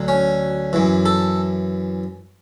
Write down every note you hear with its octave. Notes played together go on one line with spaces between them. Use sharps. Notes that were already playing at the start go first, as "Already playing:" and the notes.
Already playing: D2 D3 F#3
C#4
F#2 E3
A4